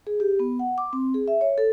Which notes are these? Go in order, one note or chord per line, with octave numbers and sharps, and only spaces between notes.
G#4
G4
B3
F#5
D6
C4
G#4
E5
C#5
A4